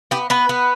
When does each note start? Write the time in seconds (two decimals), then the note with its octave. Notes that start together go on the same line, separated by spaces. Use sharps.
0.11 B3 G4
0.30 B3 B4
0.49 B3